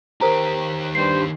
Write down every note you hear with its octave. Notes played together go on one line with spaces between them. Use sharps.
D#3 G4 A#4 C5 A#5
G2 C5 C7